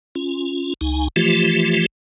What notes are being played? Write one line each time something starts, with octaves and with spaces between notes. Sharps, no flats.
C#4 F4
C#2 D#4 G#5
E3 F3 A3 F4 G4